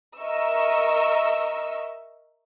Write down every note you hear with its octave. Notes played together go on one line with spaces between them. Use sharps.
A#4 D#5 E5 C#6 E6